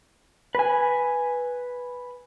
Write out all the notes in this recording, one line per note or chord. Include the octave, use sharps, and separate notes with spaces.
B4 G#5